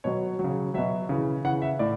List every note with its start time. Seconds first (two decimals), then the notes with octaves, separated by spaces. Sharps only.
0.04 B2 F#3 C#5
0.39 F#3
0.44 C#3
0.74 B2 F#3 E5
1.09 C#3 E3
1.44 C#3 E3 F#5
1.62 E5
1.79 A2 D5